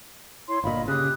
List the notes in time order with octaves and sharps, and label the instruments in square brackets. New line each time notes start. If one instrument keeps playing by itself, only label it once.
[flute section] E4 C#5 C6
[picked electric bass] G1 A#2 [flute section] D#5 F5 B5
[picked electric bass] C#3 [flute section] G4 D#6 F#6